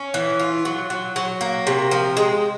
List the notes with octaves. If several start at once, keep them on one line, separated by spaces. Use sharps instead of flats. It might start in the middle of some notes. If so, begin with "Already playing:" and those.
Already playing: C#4
E3
F4
F#3
F#3
F#3
A#3
C3
F3
G#3